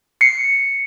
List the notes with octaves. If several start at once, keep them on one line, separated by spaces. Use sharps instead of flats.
C7 C#7